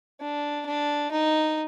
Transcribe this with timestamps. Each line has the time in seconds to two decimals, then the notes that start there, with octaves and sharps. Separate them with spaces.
0.21 D4
0.66 D4
1.11 D#4